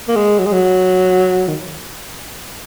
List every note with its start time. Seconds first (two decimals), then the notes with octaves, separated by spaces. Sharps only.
0.08 A#3
0.16 G#3
0.39 F#3
0.46 G#3
0.53 F#3
1.48 D#3